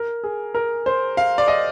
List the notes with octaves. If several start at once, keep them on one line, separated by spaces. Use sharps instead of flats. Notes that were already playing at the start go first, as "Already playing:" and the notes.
Already playing: A#4
G#4
A#4
C5
F5
D5
D#5